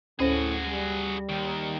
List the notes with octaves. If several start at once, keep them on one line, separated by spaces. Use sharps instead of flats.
D2 A2 C#4 F#4 G#4 C5
G3
D#2 D#3